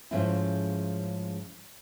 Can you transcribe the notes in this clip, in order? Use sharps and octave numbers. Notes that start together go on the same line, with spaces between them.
G#2 C#3 F3 A3 C#4 E4